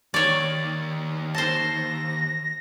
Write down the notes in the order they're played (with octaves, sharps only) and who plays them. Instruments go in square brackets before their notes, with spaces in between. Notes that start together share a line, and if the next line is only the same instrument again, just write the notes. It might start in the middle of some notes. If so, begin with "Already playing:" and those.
[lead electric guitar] D#2 D#3 [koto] C#5 D5
[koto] C5 A5 [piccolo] A#6